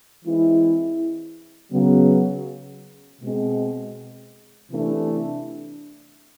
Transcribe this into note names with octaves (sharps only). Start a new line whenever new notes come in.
E3 G#3 C4 E4
C#3 F#3 B3
B2 G#3 C4
C3 E3 A3 D4